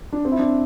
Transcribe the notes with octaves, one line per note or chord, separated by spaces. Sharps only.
D4
C4
E4
D4